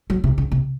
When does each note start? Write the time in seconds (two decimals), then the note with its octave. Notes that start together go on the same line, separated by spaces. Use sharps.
0.10 F#3
0.24 C3
0.38 C#3
0.52 C3